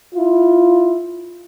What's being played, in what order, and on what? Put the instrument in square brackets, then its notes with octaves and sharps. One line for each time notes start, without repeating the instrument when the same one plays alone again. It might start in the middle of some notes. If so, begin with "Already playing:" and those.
[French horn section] E4 F4